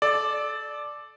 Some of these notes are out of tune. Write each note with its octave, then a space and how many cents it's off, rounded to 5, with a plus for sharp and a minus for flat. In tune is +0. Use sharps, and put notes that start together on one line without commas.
A4 -25 D5 +5